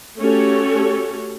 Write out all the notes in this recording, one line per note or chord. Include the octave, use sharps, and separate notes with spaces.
A3 C#4 F#4 G4 A4 C#5